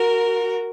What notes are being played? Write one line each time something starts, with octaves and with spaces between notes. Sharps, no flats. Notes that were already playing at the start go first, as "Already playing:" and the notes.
Already playing: F#4 A#4